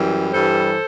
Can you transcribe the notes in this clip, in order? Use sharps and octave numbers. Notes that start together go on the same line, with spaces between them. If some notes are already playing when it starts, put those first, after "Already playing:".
Already playing: F#2 E3 G3
G2 E3 G3 A4 C5